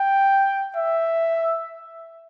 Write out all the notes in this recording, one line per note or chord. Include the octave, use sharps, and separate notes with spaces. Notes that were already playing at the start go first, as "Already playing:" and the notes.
Already playing: G5
E5